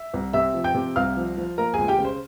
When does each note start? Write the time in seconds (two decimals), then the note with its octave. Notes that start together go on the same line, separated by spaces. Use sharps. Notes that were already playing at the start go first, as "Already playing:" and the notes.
Already playing: E5
0.14 C2
0.33 C3 E5 E6
0.54 F3
0.64 G5 G6
0.75 C3
0.96 C2 F5 F6
1.17 F3
1.37 F3
1.58 A#3 A#4 A#5
1.74 C#2 G#4 G#5
1.88 G4 G5
1.99 C#3
2.05 C5